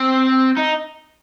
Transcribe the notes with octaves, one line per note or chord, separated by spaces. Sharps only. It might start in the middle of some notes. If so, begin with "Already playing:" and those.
Already playing: C4
D#4